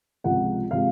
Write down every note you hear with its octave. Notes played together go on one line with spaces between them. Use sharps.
C#2 C3 F3 G#3 F#5
C3 F3 G#3 F5